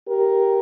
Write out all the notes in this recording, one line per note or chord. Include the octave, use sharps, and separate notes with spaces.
G4 A#4